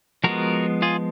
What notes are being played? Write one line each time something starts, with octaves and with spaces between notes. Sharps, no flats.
F3 G#3 B3 F#4 A#4
F4 G#4